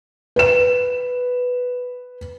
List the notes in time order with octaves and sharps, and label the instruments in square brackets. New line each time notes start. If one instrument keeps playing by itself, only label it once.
[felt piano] B4 E7